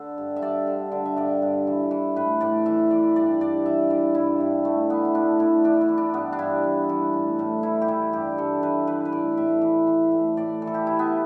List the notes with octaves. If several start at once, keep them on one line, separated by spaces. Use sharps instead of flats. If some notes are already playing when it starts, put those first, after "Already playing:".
Already playing: D3 A4 B4
G2
E5
G2 D5
D3
D3
E5
G2 D5
G2
E3
E3
A2 B4
A2 D5
E3 E5
E3 D5
G2 D5
G2 D5
E3 E5
E3 D5
G2 E4
G2
E3 A3
E3 B3
E4
A2 D4
A2 E4
E3 D4
E4
E3
D4
G2 B3
D4
G2 E4
E3
E3
A2
A2
E3 E4
G4
E3 E4
G2 G4
G2 A4
E3 B4
E3 B4
B4
A2 D5
A2 E5
E3
E3
A2
A2 D5
E3
A4
G4
E3 E4
B3